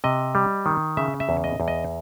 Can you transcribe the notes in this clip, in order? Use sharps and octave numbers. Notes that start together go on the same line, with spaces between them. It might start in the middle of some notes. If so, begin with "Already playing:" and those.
C3 D#5
G3
D#3
C#3 E5
E5
E2
D#5
E2
D#5